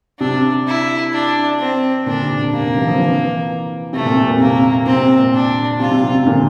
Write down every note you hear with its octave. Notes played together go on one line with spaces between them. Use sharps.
C3 D4
E4
D4
C4
A#2 D3 D4
C3
A#2
C3 A#3
C3
C3 E3
D3 F3
C3 E3
C3 A3
A#2
C3
A#2
C3 A#3
C3 C4
A#2
D4
C3 F4
C3
C3
C3
A#2 D3